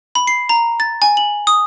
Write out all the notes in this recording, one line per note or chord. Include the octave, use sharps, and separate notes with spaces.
B5
C7
A#5
A6
G#5
F#7
D#6